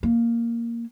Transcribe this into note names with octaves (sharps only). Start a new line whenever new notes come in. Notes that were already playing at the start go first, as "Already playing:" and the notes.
A#3